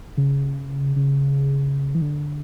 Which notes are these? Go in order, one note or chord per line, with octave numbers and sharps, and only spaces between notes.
C#3
C#3
E3
D3